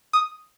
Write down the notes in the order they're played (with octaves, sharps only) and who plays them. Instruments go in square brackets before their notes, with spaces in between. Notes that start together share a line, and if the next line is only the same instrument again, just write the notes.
[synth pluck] D#6